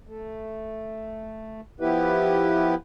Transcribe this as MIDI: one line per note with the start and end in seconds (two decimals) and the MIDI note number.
0.07 1.61 57
1.80 2.75 53
1.80 2.75 59
1.80 2.75 64
1.80 2.75 67
1.80 2.75 71